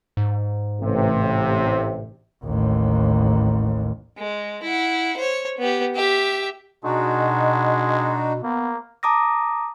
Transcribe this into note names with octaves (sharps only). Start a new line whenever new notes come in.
G#2
A1 C3
A1 D#2
G#3
E4 F#5
C5 C#5
B3 G4
G4 E5
B2 G#3 D4 D#4 F#4
A#3 B3
A5 A#5 D6 D#6 A#6